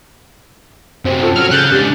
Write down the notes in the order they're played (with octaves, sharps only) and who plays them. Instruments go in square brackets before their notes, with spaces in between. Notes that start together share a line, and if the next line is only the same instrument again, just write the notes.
[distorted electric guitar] F#2 C3 [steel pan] C4
[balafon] F4 [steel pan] A4
[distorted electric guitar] F#3 [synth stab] F6
[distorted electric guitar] C#3 [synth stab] F#6 G6 A6
[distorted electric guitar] G#2 D3 [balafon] G4